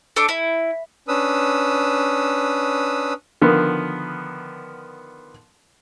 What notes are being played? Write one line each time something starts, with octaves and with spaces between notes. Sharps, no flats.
A3 D4 D6
E4
C#4 D4 B4 D#6 E6
D3 D#3 F3 B3 A#4